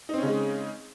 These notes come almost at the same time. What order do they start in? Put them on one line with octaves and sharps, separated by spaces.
D#4 C4 C#4 C#3 G#3